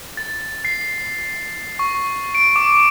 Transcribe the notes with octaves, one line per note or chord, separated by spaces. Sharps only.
A6
C7
C#6
D7
D6